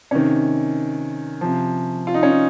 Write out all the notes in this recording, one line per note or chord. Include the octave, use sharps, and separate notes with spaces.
C3 D#3 C#4
C3 F3
F4
D#4
C#4
D#4